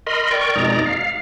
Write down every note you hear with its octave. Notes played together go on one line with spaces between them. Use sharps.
A#4 D#5 B5 C6
A#4 D5 G5 C#6
F2 B2 G#3 D#4 D5 A#5
F5